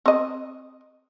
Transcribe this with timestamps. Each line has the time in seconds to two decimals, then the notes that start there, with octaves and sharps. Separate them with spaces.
0.06 C4 D#5